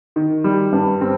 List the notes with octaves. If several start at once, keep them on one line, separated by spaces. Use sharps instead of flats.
D#3
G3
G2
C4